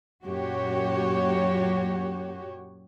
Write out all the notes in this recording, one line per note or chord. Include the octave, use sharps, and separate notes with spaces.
F#2 A#2 F#4 G4 C#5